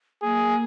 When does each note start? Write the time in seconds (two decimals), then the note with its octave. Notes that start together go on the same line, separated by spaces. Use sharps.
0.22 A#3 G#4